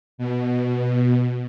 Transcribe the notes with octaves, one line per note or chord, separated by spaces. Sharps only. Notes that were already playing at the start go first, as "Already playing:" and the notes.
B2